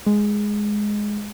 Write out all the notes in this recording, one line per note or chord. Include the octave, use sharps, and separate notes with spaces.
G#3